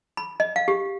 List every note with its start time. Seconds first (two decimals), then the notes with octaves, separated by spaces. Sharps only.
0.17 B5
0.40 D#5
0.56 F5
0.68 G4